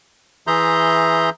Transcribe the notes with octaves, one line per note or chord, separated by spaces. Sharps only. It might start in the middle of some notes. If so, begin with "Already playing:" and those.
E3 G#4 E5 A#5 C6 G6